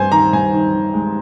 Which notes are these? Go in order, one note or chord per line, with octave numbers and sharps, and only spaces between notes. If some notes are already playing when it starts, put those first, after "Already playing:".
Already playing: G2 C4 C5 G#5
D#3 A#5
G2 G#5
D#3
D#3
G#3